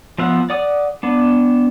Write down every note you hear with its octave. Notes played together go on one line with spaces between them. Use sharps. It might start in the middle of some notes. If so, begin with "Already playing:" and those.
F3 B3 E5 F#5
D5 F#5 D#6
B3 D4